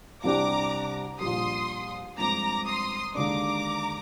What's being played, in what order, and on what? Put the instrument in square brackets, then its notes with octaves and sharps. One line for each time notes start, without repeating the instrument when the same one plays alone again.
[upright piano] C2 C3 G3 D4 G4 [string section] A#5 D6
[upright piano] A#1 A#2 G3 [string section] C6 D#6
[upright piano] G2 F3 G#3 C4 [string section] A#5 D6
[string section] C6 D#6
[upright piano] D#2 D3 G#3 D4 [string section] A#5 D6